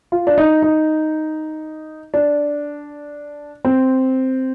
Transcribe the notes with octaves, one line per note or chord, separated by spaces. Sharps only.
F4
D4
D#4
D#4
D4
C4